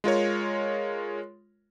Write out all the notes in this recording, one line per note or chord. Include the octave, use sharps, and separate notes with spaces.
G#3 F4 A#4 C#5